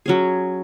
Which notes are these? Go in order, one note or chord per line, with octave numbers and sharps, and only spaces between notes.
F#3 C#4 G#4